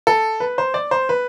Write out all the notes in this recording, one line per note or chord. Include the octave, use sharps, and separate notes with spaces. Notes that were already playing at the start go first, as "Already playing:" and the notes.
A4
B4
C5
D5
C5
B4